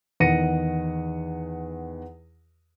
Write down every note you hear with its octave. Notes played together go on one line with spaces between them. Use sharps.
E2 D#3 F#5 A#6 C#7 D#7